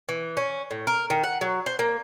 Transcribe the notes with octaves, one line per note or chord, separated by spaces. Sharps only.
E3
C#4
A2
A#4
D#3
F#5
F#3
C5
A#3